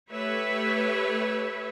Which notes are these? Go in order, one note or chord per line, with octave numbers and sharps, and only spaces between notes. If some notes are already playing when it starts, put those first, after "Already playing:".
A3 G4 B4 C#5 E5